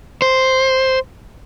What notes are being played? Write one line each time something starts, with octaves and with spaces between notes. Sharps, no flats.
C5